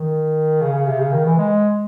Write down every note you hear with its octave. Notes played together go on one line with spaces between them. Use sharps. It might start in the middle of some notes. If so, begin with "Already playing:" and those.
Already playing: D#3
C#3
C#3
C3
C#3
D#3
E3
G#3